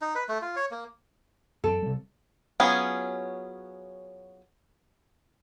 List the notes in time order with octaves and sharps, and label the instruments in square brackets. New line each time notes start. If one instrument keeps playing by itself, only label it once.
[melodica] D#4
B4
A3
F4
C#5
A#3
[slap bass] F#2 C4 [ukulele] A4
[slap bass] C3 G3
[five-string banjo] F#3 B3 C#4 F4 G#4